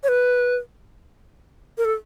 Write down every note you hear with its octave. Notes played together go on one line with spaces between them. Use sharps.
C#5
B4
A#4
A4